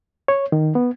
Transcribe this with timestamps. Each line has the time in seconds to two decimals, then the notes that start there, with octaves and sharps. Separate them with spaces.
0.28 C#5
0.52 D#3
0.75 B3